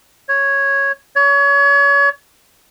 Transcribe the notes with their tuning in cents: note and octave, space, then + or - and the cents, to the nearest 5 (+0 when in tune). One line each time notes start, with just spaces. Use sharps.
C#5 -5
C#5 +30